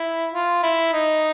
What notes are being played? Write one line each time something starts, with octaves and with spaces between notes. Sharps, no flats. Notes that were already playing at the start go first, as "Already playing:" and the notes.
Already playing: E4
F4
E4
D#4